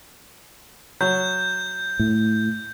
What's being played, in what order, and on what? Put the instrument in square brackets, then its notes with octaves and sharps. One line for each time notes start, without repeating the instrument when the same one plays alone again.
[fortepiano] F#3 [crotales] G6
[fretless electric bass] A2